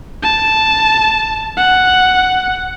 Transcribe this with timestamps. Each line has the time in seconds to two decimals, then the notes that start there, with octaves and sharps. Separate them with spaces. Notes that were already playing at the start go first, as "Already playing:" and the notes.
0.23 A5
1.57 F#5